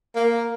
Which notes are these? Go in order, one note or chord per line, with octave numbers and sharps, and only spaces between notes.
A#3